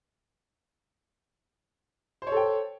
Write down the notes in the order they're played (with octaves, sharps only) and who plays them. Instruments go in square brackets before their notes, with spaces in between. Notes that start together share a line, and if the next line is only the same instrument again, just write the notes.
[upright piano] C5
C#5
A4
G5